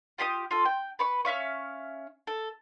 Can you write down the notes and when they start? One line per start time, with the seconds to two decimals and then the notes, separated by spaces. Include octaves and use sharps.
0.18 F4 G4 C6 D#6
0.51 F4 A4
0.65 G5
0.99 B4 B5 C#6
1.25 C#4 E5 F5 C#6
2.27 A4